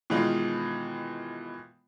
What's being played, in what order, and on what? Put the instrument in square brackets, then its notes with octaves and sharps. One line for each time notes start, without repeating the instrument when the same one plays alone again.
[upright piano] B2 D#3 E3 G#3 F4